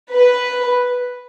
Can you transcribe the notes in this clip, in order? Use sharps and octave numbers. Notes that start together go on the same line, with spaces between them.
B4